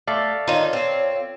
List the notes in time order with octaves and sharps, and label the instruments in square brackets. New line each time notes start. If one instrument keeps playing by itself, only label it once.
[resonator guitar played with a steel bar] A3 [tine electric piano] A4 D5 F5
[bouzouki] D#3 D#4 [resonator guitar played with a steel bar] F4 [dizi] C#5
[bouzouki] C4